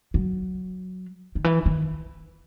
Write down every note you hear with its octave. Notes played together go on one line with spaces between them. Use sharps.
F#3
D#3
E3
D#3